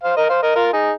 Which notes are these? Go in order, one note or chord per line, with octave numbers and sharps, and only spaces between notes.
C5 F5
A#4 D#5
C5 F5
A#4 D#5
F4 A#4
D#4 G#4